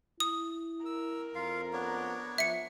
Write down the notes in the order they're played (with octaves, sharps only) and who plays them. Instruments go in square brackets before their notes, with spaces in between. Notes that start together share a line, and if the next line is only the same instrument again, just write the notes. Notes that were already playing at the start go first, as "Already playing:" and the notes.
[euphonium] E4 [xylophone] D#6
[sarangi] A#4 [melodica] E6
[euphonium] F2 [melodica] F4 F5
[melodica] B3 D4 C#5
[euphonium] F3 [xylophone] E5 C#7